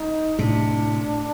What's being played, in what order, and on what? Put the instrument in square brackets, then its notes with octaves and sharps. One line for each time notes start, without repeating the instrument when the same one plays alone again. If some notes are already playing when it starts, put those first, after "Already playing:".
Already playing: [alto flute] D#4
[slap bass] A2 C3 [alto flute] D4